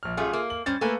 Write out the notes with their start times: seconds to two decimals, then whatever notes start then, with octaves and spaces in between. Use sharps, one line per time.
0.03 A#1 F6
0.17 F#2 G3 A3 F4 G#4
0.33 A#3
0.50 F#7
0.66 G3 C#4 C5 A6
0.81 A3 A#3 A4 B4 G#5